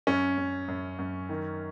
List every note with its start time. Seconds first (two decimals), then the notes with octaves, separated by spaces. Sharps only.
0.07 F#2 C#4
0.38 F#2
0.68 F#2
0.99 F#2
1.29 D#3